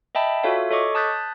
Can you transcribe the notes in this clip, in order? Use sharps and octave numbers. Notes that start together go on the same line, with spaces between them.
D#5 E5 G5 A5 B5
F4 F#4 A4 C#5 E5 F5
A4 C#5 D#5 C#6 D6
A5 D#6 F#6 G6 A6 B6